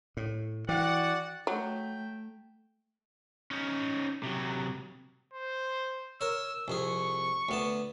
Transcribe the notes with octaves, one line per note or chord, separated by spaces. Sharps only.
A2
E3 F#4 D5 F#5 G5
F#3 A3 G5
C#4 D#4
C3 F#3
C5
A#4 C#5 E6
C2 F2 G#4 C#6
D2 B3 A5